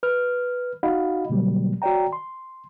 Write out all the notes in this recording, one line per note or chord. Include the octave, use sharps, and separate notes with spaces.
B4 F6
D#4 F#4 D#5 F5 F#5 B5
B2 D3 F#3 G3 A#3
F#4 C#5 D5 G5 A#5
C6